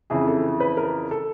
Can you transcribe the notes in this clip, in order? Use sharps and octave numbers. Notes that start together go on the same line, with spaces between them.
F2 C#3 E3 G#4
A4
B4
A#4
A4